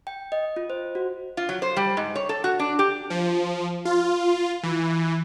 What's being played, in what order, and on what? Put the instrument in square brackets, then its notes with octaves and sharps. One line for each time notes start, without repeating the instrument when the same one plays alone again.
[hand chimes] G5
D#5
F4
C5
F#4
[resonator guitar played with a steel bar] F4
F#3
C5
G3
G#2
C#5
A4
F#4
D4
G4
[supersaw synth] F3
F4
E3